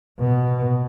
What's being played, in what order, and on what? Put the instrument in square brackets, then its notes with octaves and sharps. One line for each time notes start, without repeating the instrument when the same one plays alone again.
[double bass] B2